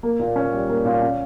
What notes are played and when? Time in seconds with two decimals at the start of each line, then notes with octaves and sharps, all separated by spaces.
0.03 A#3
0.19 A#2
0.36 C#4
0.53 G3
0.69 A#3
0.85 A#2
1.02 C#4